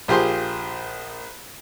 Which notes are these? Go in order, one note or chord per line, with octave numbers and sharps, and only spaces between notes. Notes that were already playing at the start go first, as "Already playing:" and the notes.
A#1 F4 G4 G#4 C5 C6